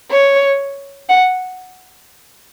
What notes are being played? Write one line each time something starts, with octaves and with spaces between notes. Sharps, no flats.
C#5
F#5